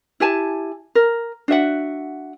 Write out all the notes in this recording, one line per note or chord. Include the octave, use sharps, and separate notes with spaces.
E4 G4 G#5 A5
A#4
D4 F#4 E5 F#5